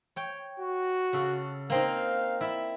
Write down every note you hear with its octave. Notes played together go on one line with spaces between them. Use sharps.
C#5 G5
F#4
C#3 A4
A#3 C4 D#4 F5
E4 D5 E5